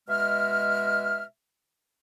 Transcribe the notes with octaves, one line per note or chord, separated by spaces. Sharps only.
B2 G#3 E5 F6